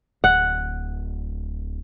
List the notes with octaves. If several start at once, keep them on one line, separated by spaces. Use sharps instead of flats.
D1 F#5